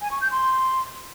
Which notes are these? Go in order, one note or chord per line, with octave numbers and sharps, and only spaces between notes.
G#5
C#6
G6
C6